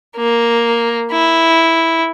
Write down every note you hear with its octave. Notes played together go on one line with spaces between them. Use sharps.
A#3
E4